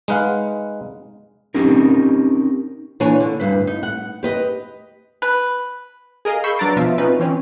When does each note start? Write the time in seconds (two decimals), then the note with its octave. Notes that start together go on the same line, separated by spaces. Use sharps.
0.08 G#3 D#4 B4 F5 F#5
1.55 C4 C#4 D#4 G4 A#4
3.00 A#2 E3 D4 C#5 G#5
3.20 D3
3.40 D2 G2 B4
3.67 D#4
3.83 F#5
4.23 G4 B4 D#5
5.22 B4
6.25 G#4 A#4 D#5 F5
6.44 B5 C#6 E6 G6 C7
6.59 F#3 D4 B4 A#5 A6 D7
6.76 B2 F3 F4 E5
6.98 C4 C#4 D#4 F4 B4
7.20 E3 C4 C#4